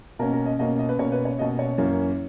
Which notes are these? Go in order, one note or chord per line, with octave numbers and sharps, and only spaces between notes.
B2 A#3 C#4 A#4
A#4
D#5
B2 A#3 C#4 D#5
D#5
B4
B2 A#3 C#4 C#5
B4
C#5
B2 A#3 C#4 D#5
C#5
F#2 E3 A#3 C#4